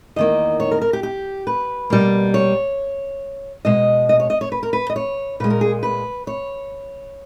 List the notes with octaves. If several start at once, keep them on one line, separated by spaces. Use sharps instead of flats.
E2 D#3 A#3 D#5
C#5
A#4
A#4
G4
G4
B4
B2 G3 A#3
C#5
B2 G#3 D#5
D#5
C#5
D#5
C#5
B4
A#4
B4
D#5
C#5
A#2 G#3 B4
A#4
G#4
B4
C#5